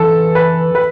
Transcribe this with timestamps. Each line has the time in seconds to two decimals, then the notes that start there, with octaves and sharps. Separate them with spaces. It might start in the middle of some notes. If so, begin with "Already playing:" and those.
Already playing: E3 A4
0.35 B4
0.75 B4